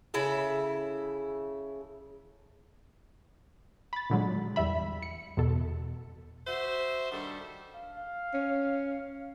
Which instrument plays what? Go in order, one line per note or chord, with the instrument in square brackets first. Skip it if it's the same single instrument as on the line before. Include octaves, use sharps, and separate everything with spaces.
[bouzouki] C#3 E4 A4
[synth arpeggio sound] B5 A6
A#2 D3 F#3 G#3
E2 G3 E5 B5
C#7
E2 B2 A4
[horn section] F#4 C5 E5
G2 D#3 G3 A4
[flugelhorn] F5
[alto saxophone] C#4